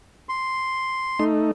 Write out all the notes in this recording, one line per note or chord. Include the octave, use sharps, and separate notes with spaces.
C6
A3 D#4